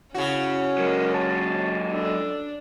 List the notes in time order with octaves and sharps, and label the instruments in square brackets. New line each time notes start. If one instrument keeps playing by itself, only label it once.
[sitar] C#3 F#4 [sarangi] C#4 [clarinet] E4
[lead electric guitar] F#3 G#3 [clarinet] A#4
[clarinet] A5
[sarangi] D4 [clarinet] A4